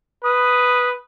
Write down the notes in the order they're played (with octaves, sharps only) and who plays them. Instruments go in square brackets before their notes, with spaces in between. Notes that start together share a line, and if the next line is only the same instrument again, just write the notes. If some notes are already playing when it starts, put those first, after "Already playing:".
[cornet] B4 [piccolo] D#6